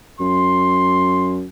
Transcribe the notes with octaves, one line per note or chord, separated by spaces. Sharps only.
F#2 C6